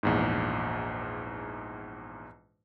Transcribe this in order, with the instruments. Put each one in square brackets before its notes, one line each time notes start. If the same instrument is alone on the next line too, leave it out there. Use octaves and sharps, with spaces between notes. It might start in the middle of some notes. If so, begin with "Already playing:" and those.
[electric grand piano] A#1 E2 G#2